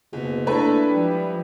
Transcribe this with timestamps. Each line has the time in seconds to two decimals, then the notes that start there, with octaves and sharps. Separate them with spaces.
0.13 F#1 B2
0.47 A3 A#3 D4 E4 B4
0.88 F3 G3 G#3